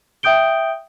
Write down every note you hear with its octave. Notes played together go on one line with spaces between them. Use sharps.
E5 G5 D#6 G6 D7 G7